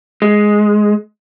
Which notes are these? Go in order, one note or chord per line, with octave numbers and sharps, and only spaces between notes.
G#3